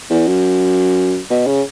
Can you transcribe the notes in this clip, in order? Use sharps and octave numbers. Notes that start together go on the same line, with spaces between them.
E2
F#2
B2
C#3